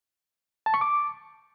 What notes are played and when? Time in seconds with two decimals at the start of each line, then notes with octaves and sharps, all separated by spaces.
0.66 A5
0.74 C#6
0.81 D6